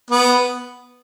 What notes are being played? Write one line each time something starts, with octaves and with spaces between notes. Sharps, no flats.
B3